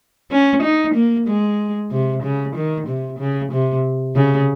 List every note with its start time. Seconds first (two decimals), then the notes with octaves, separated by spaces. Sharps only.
0.32 C#4
0.63 D#4
0.95 A#3
1.28 G#3
1.91 C3
2.23 C#3
2.56 D#3
2.88 C3
3.19 C#3
3.52 C3
4.16 C#3